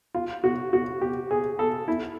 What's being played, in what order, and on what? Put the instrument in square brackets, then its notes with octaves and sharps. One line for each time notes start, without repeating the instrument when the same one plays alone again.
[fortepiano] F4
F#4
F#4
G4
G#4
A4
E4